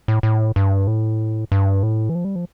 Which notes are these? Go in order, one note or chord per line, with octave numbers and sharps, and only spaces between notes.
A2
A2
G2
A2
G2
A2
E3
F3
G3
F3